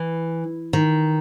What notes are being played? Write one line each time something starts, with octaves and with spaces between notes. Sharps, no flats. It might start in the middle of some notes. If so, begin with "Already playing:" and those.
Already playing: E3
D#3